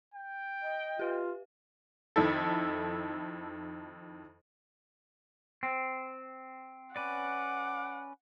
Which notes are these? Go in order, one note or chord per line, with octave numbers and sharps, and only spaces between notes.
G5
D#5
F4 G4 B4 F5
F2 D#3 E4 A4
C4
C#4 B4 D5 F#5 D6